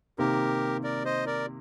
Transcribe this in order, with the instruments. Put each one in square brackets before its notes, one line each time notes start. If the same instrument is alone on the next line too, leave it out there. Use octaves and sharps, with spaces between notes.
[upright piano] C3 D#3 A#3 [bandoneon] G4 A#4
[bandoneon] A#4 D5
C5 D#5
A#4 D5